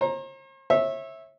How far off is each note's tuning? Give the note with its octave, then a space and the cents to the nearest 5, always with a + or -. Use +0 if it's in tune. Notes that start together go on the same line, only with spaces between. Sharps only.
C5 +45 A#5 +0
C#5 -35 E5 -10